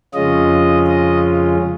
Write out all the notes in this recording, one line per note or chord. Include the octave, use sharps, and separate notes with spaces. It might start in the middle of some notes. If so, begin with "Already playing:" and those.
F2 C#3 G#3 C#4 F4 D#5
D#5